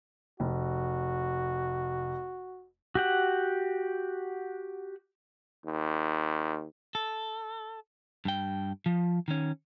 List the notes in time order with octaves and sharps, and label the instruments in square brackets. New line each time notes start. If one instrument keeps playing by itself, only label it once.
[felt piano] F1 [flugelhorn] F#4
[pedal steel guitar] F#4 G4 F#5
[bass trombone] D#2
[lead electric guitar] A4
G2 G5
F3
D#3 C#4